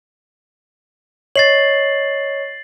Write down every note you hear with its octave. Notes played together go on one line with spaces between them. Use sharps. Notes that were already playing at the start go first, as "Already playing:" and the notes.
C#5 D#5 A6 C7 F#7